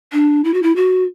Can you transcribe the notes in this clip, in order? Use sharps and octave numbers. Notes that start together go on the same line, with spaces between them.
D4
E4
F#4
E4
F#4